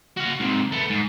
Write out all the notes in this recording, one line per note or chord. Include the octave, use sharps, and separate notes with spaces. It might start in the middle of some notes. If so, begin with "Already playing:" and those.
F#4 F5
G#2 C3
A3 B3
G#2